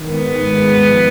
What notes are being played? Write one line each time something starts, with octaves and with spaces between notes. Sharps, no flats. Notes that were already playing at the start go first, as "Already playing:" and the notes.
Already playing: D#3
G#2 B3
G#2
G#3
G#2
G#3
F3